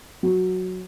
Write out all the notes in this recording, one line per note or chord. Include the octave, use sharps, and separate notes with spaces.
F#3